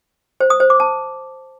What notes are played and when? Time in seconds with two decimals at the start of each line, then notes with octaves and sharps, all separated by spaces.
0.40 C5
0.50 D#6
0.60 C5
0.70 D6
0.80 A5